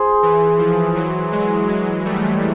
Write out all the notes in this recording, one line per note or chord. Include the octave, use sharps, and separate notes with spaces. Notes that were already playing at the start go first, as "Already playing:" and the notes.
Already playing: G#4 C5
E3
F3
E3 F#3
F#3 G#3
F#3 G#3
G3 A3